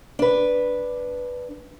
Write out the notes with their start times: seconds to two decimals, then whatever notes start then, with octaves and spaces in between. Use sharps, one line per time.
0.19 D4 B4